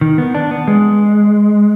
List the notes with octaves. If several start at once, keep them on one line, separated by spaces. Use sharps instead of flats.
D#3
B3
D4
B3
G#3